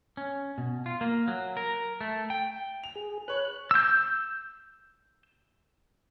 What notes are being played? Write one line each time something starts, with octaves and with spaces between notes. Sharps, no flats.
C#4
B2
F4
A#3
F#3
A#4
A3
G5
F7
G#4
B4 C#5 F#6
E6 G6